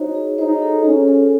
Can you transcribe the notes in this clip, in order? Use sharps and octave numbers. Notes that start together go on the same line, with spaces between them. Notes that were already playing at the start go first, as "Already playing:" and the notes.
Already playing: D#4 F#4 C5 C#5
G#4
D#4 C5
A4
C#4 G#4
A4